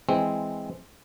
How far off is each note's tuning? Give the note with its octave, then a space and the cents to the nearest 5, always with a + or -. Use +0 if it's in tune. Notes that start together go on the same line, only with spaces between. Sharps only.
E3 +0 G#3 +0 C4 +0